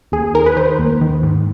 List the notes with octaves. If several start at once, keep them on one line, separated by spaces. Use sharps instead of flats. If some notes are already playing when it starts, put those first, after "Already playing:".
D#2 G#4
D#3 A#4
B4
D#3 C5
D#2
D#3
G#2